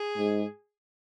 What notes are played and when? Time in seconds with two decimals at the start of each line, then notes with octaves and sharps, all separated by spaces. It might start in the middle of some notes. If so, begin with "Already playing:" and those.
Already playing: G#4
0.17 G#2